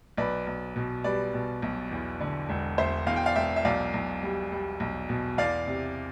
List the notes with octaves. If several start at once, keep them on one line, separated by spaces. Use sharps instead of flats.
B1 B4 D5
B1
B2
G3 B4 D5
B2
B1
E2
D3
E1
E1 C5 E5
E2 F5
G5
D5 F5
E1 E5 G5
E5
B1 D5 F5
B1
G3
G3
B1
B2
E2 D5 F5
C3